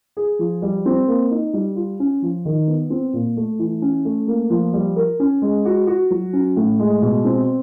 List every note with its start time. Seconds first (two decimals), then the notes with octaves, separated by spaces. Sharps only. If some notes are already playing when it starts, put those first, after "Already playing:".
0.17 G#4
0.39 F3
0.62 G3
0.86 C4
1.08 A#3
1.31 D#4
1.53 G3
1.76 F4
2.00 C#4
2.22 F3
2.45 D#3
2.68 B3
2.90 C4
3.13 A#2
3.37 A3
3.59 E3
3.82 C#4
4.05 A3
4.27 A#3
4.50 F3
4.73 G3
4.96 A#4
5.20 C#4
5.42 G#3
5.65 F#4
5.87 F#4
6.11 F#3
6.33 C#4
6.56 A2
6.79 G#3
7.02 B2
7.25 C4